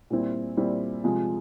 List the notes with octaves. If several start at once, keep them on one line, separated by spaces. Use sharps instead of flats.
A#2 G3 C4 E4
A#2 G3 C4 E4
C3 F3 G#3